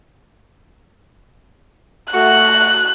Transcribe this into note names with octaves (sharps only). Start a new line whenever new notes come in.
A3 F#4 F#6